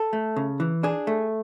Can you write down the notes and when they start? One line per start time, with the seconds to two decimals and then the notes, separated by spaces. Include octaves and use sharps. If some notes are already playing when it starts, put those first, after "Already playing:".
Already playing: A4
0.13 A3
0.36 C#3
0.60 E3
0.83 D4 G#4
1.07 A3